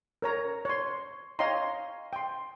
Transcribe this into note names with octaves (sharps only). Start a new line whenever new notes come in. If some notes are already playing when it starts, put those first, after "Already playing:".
A#4 C#5 A#5
C#5 C6
C#5 D#5 F5 G5 A#5 C6
G5 C6